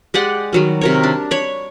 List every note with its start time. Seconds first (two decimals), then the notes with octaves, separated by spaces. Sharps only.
0.14 G#3 G4 D5 F#5
0.53 D#3 F#3 G3
0.81 C3 A#4 C#5
1.03 D4
1.31 C#5 B5